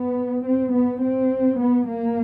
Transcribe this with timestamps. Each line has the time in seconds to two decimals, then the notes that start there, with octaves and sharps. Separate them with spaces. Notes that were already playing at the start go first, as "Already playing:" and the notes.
Already playing: B3
0.45 C4
0.73 B3
1.03 C4
1.60 B3
1.88 A#3